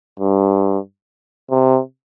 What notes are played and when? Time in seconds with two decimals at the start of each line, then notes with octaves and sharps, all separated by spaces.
0.19 G2
1.50 C3